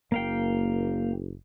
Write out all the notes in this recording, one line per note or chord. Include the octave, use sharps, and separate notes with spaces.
F#1 A#3 F5 G5